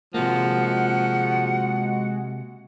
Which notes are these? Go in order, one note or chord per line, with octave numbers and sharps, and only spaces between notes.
C3 F3 G#3 A#3 F#4 F#5